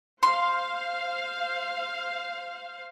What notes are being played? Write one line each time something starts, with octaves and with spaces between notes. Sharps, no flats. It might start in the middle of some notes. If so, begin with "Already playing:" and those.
C5 F5 C6